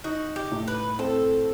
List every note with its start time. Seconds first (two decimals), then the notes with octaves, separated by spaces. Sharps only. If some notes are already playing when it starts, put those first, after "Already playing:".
0.04 D#4 F#4
0.36 G4
0.52 A2
0.68 B4
0.99 C4 A4